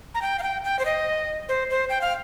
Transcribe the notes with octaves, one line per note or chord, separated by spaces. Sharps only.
A#5
G5
F5
G5
G5
C5
D#5
C5
C5
G5
F5